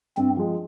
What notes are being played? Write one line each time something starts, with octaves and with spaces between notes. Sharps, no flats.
G2 C4
F3 G#3